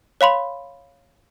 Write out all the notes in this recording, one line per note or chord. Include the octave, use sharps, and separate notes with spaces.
C#5 F5 B5 C6